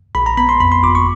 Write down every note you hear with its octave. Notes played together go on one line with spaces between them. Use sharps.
A#1 B5
A#5
B3 B5
C6
F2 B5
C6
G1 D6
C#6